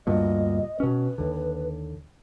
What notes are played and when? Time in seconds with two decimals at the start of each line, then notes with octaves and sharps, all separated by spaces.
0.07 D2 G2 A#2 D#5
0.80 B2 C#4 B4
1.18 D#2 D3